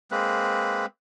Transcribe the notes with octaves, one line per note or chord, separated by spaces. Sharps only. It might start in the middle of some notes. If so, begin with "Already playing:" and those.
G#3 A#3 C4 B4